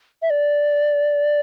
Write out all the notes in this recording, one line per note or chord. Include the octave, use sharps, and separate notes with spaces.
E5
D5